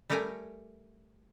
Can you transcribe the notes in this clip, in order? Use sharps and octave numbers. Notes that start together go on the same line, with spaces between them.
G3 A3 G4 A#4 G5 G#5